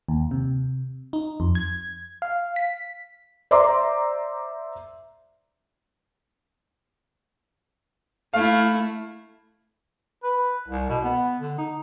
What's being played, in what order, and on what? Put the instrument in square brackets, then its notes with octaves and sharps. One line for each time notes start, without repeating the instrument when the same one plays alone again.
[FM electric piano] D#2
C3
D#4
F2
G#6
F5
B6
[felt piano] C5 D5 E5 A#5 C6 D6
[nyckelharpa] A3 E4 [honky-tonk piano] F5
[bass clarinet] B4
C2
B2
B3
D3
D#4